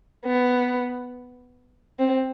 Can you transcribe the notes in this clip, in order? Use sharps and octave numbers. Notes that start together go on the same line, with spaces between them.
B3
C4